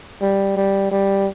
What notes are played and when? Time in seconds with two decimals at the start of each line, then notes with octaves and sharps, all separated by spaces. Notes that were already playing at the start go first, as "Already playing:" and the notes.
0.22 G3
0.57 G3
0.91 G3